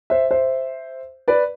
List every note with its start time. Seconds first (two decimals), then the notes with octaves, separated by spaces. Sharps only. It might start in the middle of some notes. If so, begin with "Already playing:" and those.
0.10 C5 E5
0.31 C5 E5
1.28 B4 D5